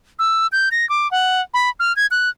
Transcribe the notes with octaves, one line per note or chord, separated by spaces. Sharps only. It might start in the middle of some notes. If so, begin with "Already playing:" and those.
E6
G6
A#6
D6
F#5
B5
F6
G#6
F#6